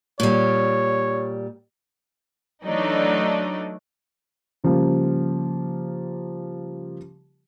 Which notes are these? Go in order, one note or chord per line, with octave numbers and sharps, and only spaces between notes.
A#2 G3 C#5
E3 F#3 A3 D4 D#4 D5
C#3 F3 G3 A#3